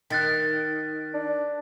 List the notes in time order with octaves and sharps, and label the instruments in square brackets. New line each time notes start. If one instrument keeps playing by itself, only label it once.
[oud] D#3 [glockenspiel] F#6 A6 B6
[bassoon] D4